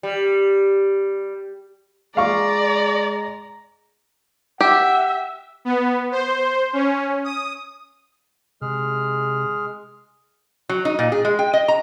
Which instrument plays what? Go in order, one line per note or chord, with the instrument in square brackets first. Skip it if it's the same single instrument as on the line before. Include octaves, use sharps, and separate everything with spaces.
[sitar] G3
[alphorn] G#3 [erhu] D5 [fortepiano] F5 C#6 [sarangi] A#5
[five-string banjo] G4 [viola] E5 [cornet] F#5
[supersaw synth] B3
C5
C#4
D#6
[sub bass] C3 [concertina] G#3 G#4 F6
[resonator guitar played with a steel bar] F#3
D#4
A#2
G#4
G#3
G5
D#5
A#5